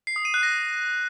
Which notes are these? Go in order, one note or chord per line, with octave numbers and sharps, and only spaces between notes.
C7
D#6
D#7
F#6
A#6